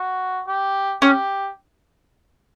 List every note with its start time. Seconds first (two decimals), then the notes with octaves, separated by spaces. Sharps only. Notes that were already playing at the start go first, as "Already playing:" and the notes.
Already playing: F#4
0.47 G4
1.02 C#4 G4